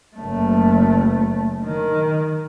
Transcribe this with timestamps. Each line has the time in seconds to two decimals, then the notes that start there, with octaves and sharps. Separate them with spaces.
0.17 F#1 A3
1.65 D#3